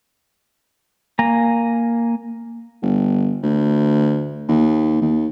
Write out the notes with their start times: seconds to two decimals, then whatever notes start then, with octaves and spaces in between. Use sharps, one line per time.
1.19 A#3 G#5 A#5
2.82 G1
3.43 D2
4.48 D#2
5.02 D#2